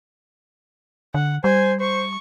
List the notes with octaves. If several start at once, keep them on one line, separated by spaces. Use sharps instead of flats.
D3 F#5
G3 C5 G#5
C5 C#6